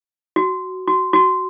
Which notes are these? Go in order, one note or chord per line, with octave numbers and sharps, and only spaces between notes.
F#4
F#4
F#4